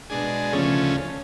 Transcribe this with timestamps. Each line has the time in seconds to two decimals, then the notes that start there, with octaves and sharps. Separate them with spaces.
0.10 B2 G#3 D4 G#4
0.52 D2 C#3 F3 A3 C#4